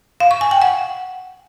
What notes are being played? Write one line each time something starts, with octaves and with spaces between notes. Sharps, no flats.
F5
C#6
G#5
G5
F#5